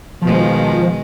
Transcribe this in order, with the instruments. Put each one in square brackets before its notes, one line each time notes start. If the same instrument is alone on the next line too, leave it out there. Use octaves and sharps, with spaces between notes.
[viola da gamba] B2 D#3 G#3 [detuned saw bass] F3